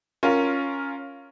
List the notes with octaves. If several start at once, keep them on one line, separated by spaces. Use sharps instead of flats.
C#4 F4 A#4